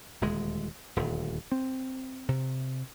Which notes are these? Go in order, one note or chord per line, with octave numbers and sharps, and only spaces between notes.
D#1 D2 G#3
D#1 D2
C4
C3